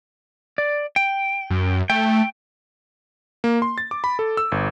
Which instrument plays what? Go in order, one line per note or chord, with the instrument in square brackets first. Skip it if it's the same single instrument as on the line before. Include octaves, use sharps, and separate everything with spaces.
[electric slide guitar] D5
G5
[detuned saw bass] F#2
[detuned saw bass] A3 [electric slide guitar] G5
[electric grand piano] A#3
C6
A6
D6
B5
A4
E6
G1